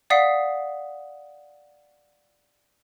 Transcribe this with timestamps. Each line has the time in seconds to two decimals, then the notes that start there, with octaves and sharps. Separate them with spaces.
0.10 D5 F5 F#5 D#6 B6 C7